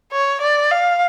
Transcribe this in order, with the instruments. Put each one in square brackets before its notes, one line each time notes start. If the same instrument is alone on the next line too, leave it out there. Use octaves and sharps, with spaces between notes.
[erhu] C#5
D5
F5